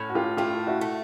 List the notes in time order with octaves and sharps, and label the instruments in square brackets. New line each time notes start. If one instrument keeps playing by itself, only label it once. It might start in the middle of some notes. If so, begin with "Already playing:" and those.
Already playing: [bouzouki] A2 C#4
[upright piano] F#4
F4 G4
[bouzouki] A3 [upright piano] F4 G4
[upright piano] E4 F#4
[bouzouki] A3